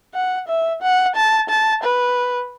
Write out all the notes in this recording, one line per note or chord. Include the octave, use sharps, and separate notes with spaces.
F#5
E5
F#5
A5
A5
B4